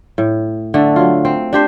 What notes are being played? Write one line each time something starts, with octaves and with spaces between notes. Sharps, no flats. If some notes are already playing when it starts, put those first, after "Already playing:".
A2
D3 A3 D4
F#3 F4
C4
D4 G4 C5